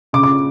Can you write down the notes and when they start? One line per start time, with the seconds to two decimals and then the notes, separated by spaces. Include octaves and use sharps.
0.13 C#3 D6
0.23 D6